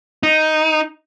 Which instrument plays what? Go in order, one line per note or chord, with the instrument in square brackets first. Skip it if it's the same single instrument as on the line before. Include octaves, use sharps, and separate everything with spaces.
[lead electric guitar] D#4